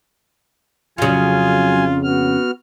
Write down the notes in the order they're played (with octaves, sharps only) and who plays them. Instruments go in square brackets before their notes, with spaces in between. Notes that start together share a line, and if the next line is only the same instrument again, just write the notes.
[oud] F2 C#3 [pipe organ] F#3 G#5 [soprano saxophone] F4
[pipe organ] B3 F#4 F6